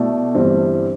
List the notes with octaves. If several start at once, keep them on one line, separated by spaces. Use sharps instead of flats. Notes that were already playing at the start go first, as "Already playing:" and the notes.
Already playing: B2 A3 E4 A4 D5
G1 G2 E3 G3 C4